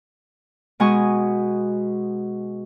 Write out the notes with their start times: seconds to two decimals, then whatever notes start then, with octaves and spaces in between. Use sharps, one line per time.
0.80 B2 G#3 F#4 G#5 C#6 D#6